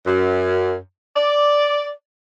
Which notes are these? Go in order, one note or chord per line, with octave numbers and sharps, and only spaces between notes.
F#2
D5